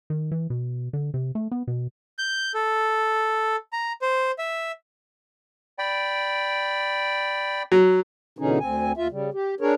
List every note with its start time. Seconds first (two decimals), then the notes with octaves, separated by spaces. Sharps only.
0.10 D#3
0.32 E3
0.50 B2
0.93 D3
1.14 C3
1.35 A3
1.51 B3
1.67 B2
2.18 G6
2.54 A4
3.73 A#5
4.02 C5
4.38 E5
5.79 D5 G5 B5
7.72 F#3
8.39 B2 D3 E3 C#4 D#4 G#4
8.60 D2 C4 G#5
8.97 D#2 F4 E5
9.11 C#3 G3
9.33 G4
9.60 D4 G#4 A#4 C#5